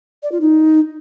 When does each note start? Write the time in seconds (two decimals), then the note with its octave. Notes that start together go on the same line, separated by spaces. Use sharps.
0.23 D5
0.32 F4
0.41 D#4